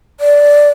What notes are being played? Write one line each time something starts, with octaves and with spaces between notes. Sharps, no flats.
D5